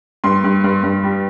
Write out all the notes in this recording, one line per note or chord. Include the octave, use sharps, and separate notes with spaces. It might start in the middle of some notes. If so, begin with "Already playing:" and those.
G2 C6
G2
G2
G2
G3